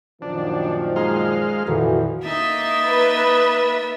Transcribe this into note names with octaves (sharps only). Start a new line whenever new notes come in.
F#2 A#2 D#3 F3 D4
G#3 F5 A#5 C6 G#6
F2 A#2 D#3 E3 F#4 A4
A#3 D#4 D#5 E5 A6
B4